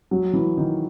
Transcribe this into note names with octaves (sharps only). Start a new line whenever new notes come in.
F#3
E3
D#3